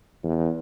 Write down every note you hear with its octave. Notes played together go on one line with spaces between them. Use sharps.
E2